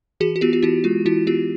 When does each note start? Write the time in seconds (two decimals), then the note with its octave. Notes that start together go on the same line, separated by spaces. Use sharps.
0.20 E3 F#4 G#4
0.36 F#4
0.41 B3 F4 G4
0.53 F4
0.63 E3 E4 F#4
0.84 G#3 F4
1.05 E3 E4 F#4
1.27 B3 F4 G4